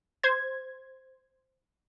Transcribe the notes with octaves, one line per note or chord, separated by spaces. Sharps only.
C5 G#6